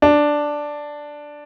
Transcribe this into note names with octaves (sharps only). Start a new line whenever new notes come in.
D4